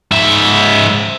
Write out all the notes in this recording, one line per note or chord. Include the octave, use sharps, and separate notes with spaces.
G#2 E5